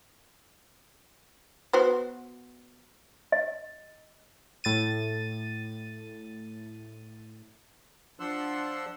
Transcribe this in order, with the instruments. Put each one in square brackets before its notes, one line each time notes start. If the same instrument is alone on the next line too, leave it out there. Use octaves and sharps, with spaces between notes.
[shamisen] B3 F#4 C5
[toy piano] D#5
[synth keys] A2 A6 D#7
[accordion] F3 D4 F#5 C6 E6